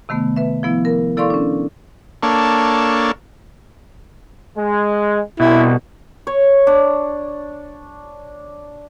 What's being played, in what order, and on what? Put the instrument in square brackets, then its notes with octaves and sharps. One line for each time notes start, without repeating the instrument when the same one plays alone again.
[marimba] C3 D#3 A3 B3
B4 E5
F3 B3 E4
A#4
E4 A4 D5 F5 C6 C#6
C#4 D4
[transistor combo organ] A#3 D4 A4 C#5
[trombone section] G#3
[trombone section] C2 [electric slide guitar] B2 [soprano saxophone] E4
[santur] C#5
D4